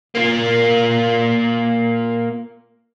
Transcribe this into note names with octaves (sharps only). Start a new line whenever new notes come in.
A#3 F4